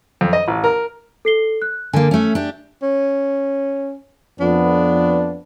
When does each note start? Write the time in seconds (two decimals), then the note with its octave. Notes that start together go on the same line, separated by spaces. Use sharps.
0.21 F2
0.33 D#5
0.48 A1
0.64 A#4
1.25 A4 C7 G7
1.62 F#6
1.93 D3 A#3 G#5
2.11 A3 C#4
2.35 D4 G4
2.83 C#4
4.40 F2 F3 B3 D4